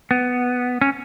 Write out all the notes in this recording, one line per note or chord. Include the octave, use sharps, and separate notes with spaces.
B3
C#4